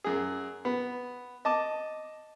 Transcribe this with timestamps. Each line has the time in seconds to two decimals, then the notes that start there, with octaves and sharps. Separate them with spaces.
0.04 F#2 G#4
0.65 B3
1.45 D#5 A5 D6